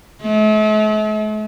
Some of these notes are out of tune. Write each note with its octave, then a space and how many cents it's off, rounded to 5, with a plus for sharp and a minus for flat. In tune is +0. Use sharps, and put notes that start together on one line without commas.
A3 -45